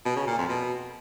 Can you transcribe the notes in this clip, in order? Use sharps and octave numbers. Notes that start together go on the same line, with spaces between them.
B2
C#3
A#2
F2
B2